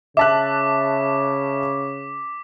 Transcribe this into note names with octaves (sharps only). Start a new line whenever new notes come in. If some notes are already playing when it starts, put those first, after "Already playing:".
C#3 E5 A5 D6 F#6 B6